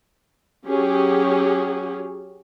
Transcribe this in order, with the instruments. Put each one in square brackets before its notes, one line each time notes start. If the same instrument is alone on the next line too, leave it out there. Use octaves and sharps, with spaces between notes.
[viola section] F#3 C#4 G4 G#4